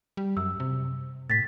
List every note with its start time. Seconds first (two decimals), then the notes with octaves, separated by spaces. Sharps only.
0.17 G3
0.37 F#2 E6
0.60 C3
1.30 A2 A6 B6